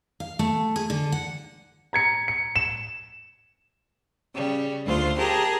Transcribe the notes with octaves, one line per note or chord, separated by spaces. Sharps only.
F5
A3
G#4
D3
F#5
A#5 G#6 C#7
C#7
E7
C#3 G3
D2 F4 C5
G4 G#4 A#4 A5